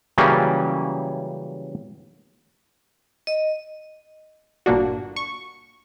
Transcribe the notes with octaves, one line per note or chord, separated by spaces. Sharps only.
C#3 E3 F#3 G3 A#3 C#4
D#5
G1 A#2 A#3 D4 F#4
C#6